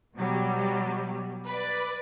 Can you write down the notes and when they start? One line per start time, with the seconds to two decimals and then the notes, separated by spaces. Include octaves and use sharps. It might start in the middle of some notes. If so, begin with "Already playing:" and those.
0.16 B2 F#3 G3
1.46 B4 D5